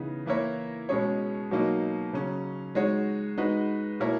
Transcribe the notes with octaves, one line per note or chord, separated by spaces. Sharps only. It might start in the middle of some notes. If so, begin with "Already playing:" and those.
Already playing: C#3 E3 B3 D#4
E3 A#3 E4 A#4 C#5
B2 G#3 C#4 G#4 C#5
B2 F#3 A#3 D#4
C#3 F#3 C#4
G#3 D#4 F#4 C#5
G#3 D#4 F#4 B4
B2 A#3 E4 A#4 C#5